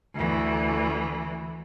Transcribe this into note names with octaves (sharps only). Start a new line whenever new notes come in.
D2 E3